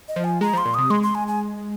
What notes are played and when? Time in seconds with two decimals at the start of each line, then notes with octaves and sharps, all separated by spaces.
0.08 D#5
0.16 F3
0.24 G#5
0.41 G#3 A#5
0.53 F3 C6
0.65 A#2
0.74 C3 D#6
0.90 G#3 C6
1.03 C6
1.15 G#5
1.28 G#5